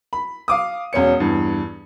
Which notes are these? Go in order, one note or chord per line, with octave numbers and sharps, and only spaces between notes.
B5
F5 D6 D#6
E1 C#4 C#5 C#7
E2 G2 E3